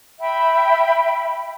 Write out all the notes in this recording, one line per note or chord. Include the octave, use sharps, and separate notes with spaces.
E5 G5 B5